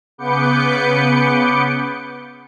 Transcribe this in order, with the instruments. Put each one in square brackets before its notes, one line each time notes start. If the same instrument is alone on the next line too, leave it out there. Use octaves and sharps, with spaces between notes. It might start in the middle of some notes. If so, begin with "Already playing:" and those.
[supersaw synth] C#3 B3 B4 D6 G6 C#7